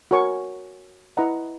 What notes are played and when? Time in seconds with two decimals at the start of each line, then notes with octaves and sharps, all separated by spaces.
0.11 F#4 A#4 C#5 G#5 C#6
1.17 E4 B4 D#5 F#5 A#5